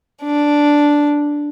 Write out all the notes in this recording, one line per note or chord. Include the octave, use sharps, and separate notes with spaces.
D4